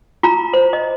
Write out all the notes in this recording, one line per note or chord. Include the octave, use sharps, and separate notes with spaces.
F4 A#5
C5
D#5